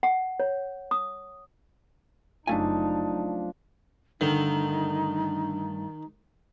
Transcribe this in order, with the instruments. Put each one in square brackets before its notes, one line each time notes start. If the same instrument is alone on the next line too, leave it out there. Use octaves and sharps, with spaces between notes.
[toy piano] F#5
C#5
D#6
[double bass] F#1 D#4 [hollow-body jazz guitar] F#2 A3 G#5 [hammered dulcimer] F3 D4
[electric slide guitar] G2 A3 [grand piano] D3 [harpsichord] D#3 [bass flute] D#4